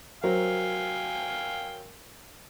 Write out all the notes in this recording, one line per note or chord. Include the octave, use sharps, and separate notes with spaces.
F#3 A#4 C5 F5 G5 G#5